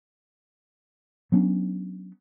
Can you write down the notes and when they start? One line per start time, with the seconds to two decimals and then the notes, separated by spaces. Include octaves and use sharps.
1.32 F#3 B3 C#4 D4